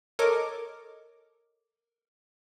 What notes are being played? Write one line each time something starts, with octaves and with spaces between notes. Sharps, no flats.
A4 A#4 C#5 D#5 D6